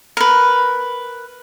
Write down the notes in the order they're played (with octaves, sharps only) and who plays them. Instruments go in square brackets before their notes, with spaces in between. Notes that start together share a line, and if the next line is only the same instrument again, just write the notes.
[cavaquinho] A#4 B4